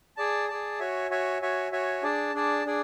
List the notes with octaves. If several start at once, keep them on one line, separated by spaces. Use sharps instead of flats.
G#4 D5 A5
G#4 D5 A5
F#4 C#5 E5 G#5
F#4 C#5 E5 G#5
F#4 C#5 E5 G#5
F#4 C#5 E5 G#5
D4 G#4 D5 A5
D4 G#4 D5 A5
D4 G#4 D5